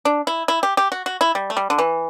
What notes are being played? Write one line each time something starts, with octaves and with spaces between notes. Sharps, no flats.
D4
E4
E4
G4
G4
F#4
F#4
E4
G3
A3
G3
D3
E3